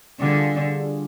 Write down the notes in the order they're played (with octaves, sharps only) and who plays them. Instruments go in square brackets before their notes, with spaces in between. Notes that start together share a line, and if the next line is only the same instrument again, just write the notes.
[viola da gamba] D3 [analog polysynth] G3 D4 F4 G#4